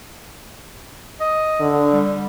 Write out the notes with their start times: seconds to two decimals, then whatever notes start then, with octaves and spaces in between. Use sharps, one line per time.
1.20 D#5
1.60 D3
1.93 G3